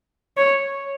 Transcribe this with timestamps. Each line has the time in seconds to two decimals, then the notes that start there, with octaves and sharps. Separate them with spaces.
0.37 C#5